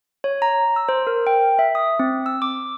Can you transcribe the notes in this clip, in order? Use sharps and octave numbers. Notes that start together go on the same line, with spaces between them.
C#5
A#5
E6
C5
A#4
G5
E5
D#6
C4
E6
D6